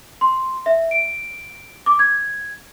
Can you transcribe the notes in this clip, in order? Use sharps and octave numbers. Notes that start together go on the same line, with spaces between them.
C6
E5
D7
D6
G#6